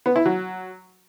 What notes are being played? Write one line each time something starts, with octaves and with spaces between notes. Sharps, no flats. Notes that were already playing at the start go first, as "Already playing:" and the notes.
B3
E4
F#3